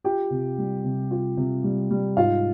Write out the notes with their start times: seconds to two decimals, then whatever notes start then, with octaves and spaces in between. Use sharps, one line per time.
0.04 F4 G4 G5
0.30 C3
0.58 G3
0.84 C3
1.11 F4
1.37 C3
1.64 G3
1.91 G3
2.17 G#2 F4 F5